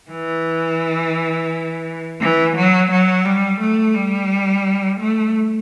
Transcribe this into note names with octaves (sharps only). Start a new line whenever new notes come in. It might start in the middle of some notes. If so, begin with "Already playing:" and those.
E3
E3
F#3
F#3
G3
A3
G3
A3